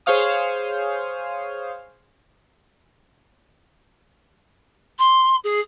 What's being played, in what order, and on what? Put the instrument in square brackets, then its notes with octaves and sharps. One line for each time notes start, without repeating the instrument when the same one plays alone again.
[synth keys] G#4 C5 C#5 F5 D#6
[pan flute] C6
G#4